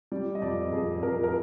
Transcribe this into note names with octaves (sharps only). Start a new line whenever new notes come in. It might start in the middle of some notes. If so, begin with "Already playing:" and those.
G3 D5
D#5
F2 D5
F2 G#4
F2 A#4
A#4